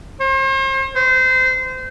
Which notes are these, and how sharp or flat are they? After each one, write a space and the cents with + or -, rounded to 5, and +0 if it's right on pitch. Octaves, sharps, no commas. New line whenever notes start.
C5 +40
C5 -25